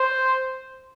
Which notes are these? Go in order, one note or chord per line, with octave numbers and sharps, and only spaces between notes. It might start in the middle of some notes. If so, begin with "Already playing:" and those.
Already playing: C5